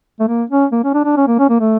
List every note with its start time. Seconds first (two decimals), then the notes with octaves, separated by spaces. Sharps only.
0.20 A3
0.28 A#3
0.50 C#4
0.72 A#3
0.84 C#4
0.94 D4
1.05 D4
1.17 C#4
1.28 A#3
1.39 C#4
1.50 A#3
1.60 A3